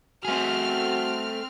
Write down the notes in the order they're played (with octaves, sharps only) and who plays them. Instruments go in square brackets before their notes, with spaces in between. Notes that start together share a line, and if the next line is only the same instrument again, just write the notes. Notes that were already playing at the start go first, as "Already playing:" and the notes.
[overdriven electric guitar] A3 G#4 [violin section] C4 F6 [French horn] F#4